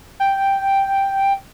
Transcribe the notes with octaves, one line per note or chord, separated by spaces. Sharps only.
G5